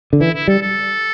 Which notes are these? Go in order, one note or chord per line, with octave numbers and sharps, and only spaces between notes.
D3
E3 E4
E4
G3 A4
A4